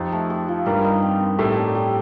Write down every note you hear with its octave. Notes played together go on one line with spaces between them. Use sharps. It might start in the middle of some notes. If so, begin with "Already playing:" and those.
Already playing: F2 F3 D#4 G4
A3
A4
F3
G2 G3 A#4
D#4
C4
C4
A2 A3 G4
D4
G3